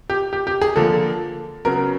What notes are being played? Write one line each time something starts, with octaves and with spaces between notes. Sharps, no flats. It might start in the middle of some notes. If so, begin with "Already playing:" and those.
G4
G4
G4
G#4
D3 F3 A#3 A4
C#3 F#3 B3 A#4